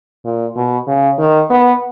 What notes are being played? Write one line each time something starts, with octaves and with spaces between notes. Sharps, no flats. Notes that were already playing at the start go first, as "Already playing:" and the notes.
A#2
B2
C#3
D#3
B3